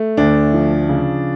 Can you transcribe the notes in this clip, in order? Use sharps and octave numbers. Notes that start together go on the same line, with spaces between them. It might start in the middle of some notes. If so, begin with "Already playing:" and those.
Already playing: A3
D2 D4
F3
C#3